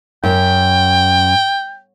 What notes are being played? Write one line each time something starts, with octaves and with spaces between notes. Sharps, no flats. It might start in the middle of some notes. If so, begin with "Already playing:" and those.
F#2 G5